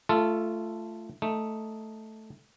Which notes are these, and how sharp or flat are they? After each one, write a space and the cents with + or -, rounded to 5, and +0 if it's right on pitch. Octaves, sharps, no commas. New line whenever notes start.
A3 +0 F4 -15 A4 +0
A3 -5 D#4 +0